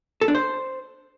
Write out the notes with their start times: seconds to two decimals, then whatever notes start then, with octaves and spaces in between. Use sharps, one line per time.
0.21 A4
0.28 D4
0.35 C5